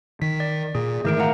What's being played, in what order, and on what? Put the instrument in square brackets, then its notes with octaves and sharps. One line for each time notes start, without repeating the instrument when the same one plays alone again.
[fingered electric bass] D#3 [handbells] B6
[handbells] D5
[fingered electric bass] A#2 [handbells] G#4
[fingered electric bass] G#2 D#3 E3 [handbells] A3 A#4 D7
[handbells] F5 F#5 A#5